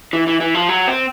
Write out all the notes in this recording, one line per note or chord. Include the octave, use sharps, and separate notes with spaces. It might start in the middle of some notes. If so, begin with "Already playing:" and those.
E3
E3
E3
F3
F#3
C4